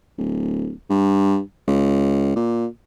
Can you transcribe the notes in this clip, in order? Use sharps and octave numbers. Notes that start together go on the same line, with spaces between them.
D1
G2
C#2
A#2